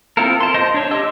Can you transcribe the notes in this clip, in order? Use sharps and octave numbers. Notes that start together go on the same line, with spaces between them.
C4 E4 F4 A4 A#4
A5 C6
C5 D#5 A5 C6
D4 C#5
G4 D#5 A5 E6